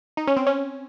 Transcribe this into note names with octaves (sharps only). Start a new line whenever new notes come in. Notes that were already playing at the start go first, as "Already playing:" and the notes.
D#4
C#4
C4
C#4